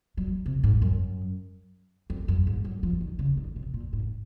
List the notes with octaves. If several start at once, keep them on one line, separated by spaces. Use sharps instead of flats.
F#3
C3
G#2
F#2
F2
F#2
G#2
F#3
F3
D#3
C#3
D#3
C3
A#2
G#2